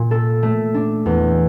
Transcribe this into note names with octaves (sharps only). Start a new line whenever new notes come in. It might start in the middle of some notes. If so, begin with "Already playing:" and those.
Already playing: A#2
A4
A3
D4
E2